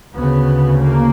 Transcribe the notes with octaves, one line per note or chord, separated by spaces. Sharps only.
D2 C#3 B3
A#3